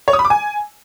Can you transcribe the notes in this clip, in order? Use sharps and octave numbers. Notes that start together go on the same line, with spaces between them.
C#5
D#6
B5
D6
G#5